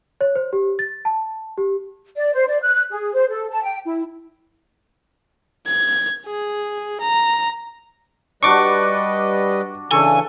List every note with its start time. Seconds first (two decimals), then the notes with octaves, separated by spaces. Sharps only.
0.21 C#5
0.36 C5
0.53 G4
0.79 A6
1.05 A5
1.58 G4
2.16 D5
2.34 C5
2.48 D5
2.62 F#6
2.91 G#4
3.15 C5
3.30 A4
3.50 A5
3.63 G5
3.85 E4
5.67 G#6
6.27 G#4
7.01 A#5
8.43 G3 D4 F#4 B4 D#5 C#6 D6
9.91 C#3 E3 D4 A4 G#5 C#6